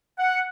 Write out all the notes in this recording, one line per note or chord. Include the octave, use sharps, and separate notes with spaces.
F#5